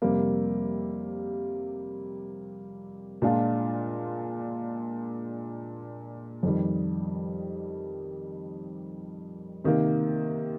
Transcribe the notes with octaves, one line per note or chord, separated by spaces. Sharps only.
F2 C3 G3 A#3
A#2 G#3 D4 F4
F2 D#3 G3
C3 D#3 A#3